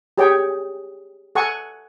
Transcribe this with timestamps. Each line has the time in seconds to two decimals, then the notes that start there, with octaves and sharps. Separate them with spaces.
0.18 G4 G#4 C#5 G5
1.35 A4 F#5 G#5 C#6